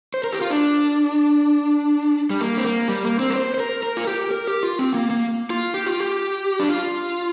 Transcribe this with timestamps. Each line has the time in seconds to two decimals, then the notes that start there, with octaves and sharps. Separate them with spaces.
0.14 C5
0.24 A#4
0.33 G4
0.41 F4
0.50 D4
2.30 G3
2.41 A#3
2.58 C4
2.65 A#3
2.88 G3
3.05 A#3
3.20 C4
3.30 A#4
3.36 C5
3.54 C5
3.60 A#4
3.83 A#4
3.97 F4
4.07 G4
4.31 A#4
4.47 G4
4.63 F4
4.79 C4
4.94 A#3
5.11 A#3
5.50 F4
5.74 G4
5.86 F4
6.00 G4
6.60 D4
6.69 F4